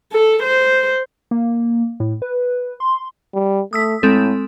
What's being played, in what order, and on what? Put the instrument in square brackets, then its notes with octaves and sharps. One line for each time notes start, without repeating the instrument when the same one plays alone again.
[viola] A4
C5
[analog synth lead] A#3
A2
B4
C6
[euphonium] G3
[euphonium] A3 [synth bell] D#6 E6 B6
[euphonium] A2 [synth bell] G#3 C4 A4